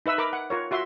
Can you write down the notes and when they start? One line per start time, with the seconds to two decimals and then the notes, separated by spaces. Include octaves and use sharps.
0.06 D#4 B4 E5 E6
0.18 A#4 B5 D6
0.33 F#5
0.50 F4 A#4 C#5
0.71 F4 F#4 E5 C6